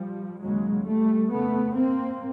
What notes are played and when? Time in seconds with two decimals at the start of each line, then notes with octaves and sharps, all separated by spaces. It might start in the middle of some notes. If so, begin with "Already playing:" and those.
Already playing: F3 G3
0.40 D#2 C#3 F#3 G#3
0.85 G3 A3
1.30 F2 C#3 A3 B3
1.75 A#3 C4